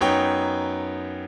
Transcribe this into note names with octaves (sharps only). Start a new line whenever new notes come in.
F#2 B3 D#4 C#5 G5